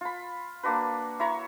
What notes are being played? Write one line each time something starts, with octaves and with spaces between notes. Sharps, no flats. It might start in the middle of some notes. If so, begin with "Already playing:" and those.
F4 B5
A#3 D4 F#4 B4
E4 C#5 A#5 C#6